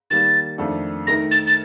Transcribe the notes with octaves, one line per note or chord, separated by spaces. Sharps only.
D#3 G3 A#3 A6
F2 D#3 A3 D4 A4
D#3 A3 D#4 A#4 A#6
A6
A6